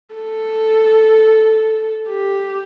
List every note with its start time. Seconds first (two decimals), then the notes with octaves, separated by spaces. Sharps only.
0.15 A4
2.09 G4